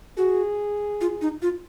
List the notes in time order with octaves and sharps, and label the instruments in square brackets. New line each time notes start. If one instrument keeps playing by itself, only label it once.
[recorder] F#4 [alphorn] G#4
[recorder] F4
D#4
F4